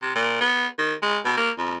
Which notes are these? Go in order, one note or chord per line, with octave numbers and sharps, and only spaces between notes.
C3
A#2
B3
D#3
G#3
B2
A#3
F2